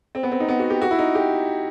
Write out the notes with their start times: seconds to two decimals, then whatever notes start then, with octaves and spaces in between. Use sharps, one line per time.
0.15 C4
0.23 B3
0.32 C4
0.40 D#4
0.48 B3
0.59 F#4
0.70 G4
0.81 F#4
0.91 E4
0.98 D#4
1.15 G4